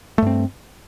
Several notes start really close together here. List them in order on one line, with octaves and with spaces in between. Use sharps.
A3 G2 C4